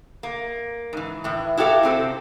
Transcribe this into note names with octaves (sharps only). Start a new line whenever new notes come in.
A#3
G#2 E3
A2 E3
E4 F#4 G4 A4 F5
C3 C4 A4